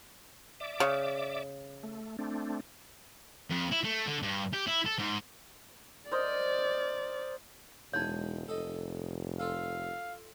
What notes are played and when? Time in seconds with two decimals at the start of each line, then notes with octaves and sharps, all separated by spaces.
0.60 D5 E5 D6
0.80 C#3
1.83 A3
2.19 A3 C4 D4
3.51 F2
3.72 E4
3.84 A3
4.07 D3
4.23 G2
4.53 G4
4.67 E4
4.86 A4
4.98 G#2
6.12 A#4 C5 D5 D#5
7.93 E1 G#3 D#4 C#5
8.48 F1 A4 D#5
9.39 F4 A4 F5